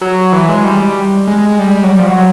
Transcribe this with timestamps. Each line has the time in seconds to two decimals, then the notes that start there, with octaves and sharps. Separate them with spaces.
0.01 F#3
0.32 E3
0.49 G#3
0.65 G3
1.27 G#3
1.38 G#3
1.49 G#3
1.59 G3
1.70 G3
1.83 F#3
1.91 G3
1.99 F3
2.07 F#3